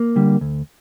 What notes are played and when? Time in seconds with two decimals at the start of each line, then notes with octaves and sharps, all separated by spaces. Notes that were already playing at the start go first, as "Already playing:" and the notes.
Already playing: A#3
0.16 D3 G3
0.41 D2